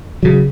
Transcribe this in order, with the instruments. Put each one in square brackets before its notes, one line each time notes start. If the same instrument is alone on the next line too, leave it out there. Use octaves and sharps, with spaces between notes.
[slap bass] C#3 F#3